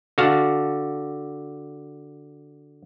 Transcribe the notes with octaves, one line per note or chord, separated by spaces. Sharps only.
D3 F#4 F5 A5